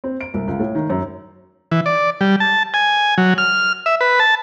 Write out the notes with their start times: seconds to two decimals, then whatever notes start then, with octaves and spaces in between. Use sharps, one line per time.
0.04 C4
0.21 D7
0.34 C2
0.47 C#2
0.59 A2
0.75 D#3
0.90 F#2
1.72 E3
1.86 D5
2.21 G3
2.40 A5
2.74 G#5
3.18 F#3
3.38 F6
3.86 E5
4.01 B4
4.19 A5